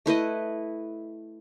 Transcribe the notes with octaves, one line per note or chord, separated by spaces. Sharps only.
A3 E4 B4 D#5